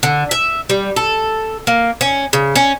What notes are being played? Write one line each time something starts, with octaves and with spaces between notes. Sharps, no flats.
D3
E5
G3
A4
A#3
C#4
C#3
C#4